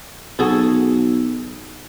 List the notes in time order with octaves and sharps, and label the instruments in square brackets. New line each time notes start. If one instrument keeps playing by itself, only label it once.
[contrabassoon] B1 [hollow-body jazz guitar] F#4 G#4 A4